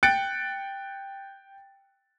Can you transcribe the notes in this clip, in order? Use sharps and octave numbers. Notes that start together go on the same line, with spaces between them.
G5 F#6 A6 C#7 D7